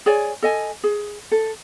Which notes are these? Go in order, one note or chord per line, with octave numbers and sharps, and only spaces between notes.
G#4 C#5 D5 G#5
A4 D#5 G#5
G#4
A4